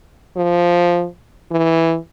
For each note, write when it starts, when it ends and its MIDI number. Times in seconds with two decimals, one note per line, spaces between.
0.36 1.06 53
1.51 1.96 52